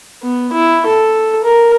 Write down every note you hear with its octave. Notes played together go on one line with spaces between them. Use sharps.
B3
E4
A4
A#4